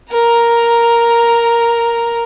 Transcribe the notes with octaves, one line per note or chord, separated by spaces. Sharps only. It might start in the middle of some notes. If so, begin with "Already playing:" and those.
A#4 A#5